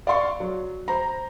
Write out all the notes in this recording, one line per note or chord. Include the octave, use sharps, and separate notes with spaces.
D5 F5 C6 C#6
F#3
C5 A#5